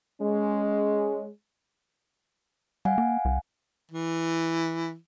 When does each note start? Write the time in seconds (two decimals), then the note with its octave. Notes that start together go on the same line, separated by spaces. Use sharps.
0.21 G#3 C#4
2.85 G3 F5 F#5 G#5
2.98 A#3
3.25 C2
3.91 E3